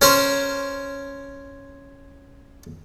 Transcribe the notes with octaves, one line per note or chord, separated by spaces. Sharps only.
C#4 A#4 C5 C#6